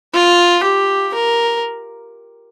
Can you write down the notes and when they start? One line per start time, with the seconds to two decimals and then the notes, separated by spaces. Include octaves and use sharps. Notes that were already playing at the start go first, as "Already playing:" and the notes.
0.14 F4
0.64 G4
1.14 A#4